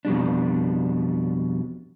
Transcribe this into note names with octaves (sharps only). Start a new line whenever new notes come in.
F2 B2 G3 D4